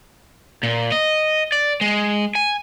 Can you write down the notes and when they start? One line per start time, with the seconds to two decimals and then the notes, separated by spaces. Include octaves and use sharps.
0.63 A#2
0.92 D#5
1.52 D5
1.81 G#3
2.35 G#5